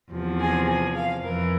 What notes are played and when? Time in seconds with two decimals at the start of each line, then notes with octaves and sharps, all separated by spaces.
0.11 E2 C3 F3
0.40 G#4
0.67 G#4
0.95 F5
1.23 F2 E3 A#4